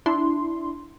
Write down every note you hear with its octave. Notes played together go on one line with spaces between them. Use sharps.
D4 E4 C6